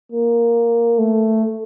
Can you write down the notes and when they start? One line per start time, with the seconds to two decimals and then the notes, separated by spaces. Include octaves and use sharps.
0.12 A#3
0.98 A3